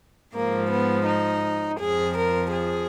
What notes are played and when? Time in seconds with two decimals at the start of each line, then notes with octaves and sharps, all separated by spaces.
0.35 G#2 F3 A#3
0.71 B3
1.07 D#4
1.80 F2 F3 G#4
2.17 A#4
2.53 G#4